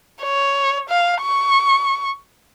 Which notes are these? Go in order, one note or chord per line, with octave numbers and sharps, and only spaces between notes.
C#5
F5
C#6